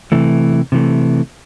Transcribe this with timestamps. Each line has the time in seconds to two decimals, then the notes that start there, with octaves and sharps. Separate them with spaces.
0.12 C3 E3 A3
0.72 C3 E3 A3